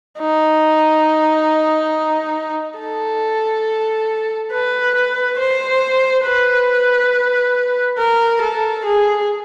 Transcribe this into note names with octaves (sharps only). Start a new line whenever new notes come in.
D#4
A4
B4
B4
C5
B4
A#4
A4
G#4